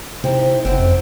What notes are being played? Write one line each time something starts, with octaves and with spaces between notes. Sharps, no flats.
C3 C4 D#4 E4
F#1 F#2 C4
F2